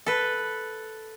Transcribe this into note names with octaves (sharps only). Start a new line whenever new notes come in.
A4 B4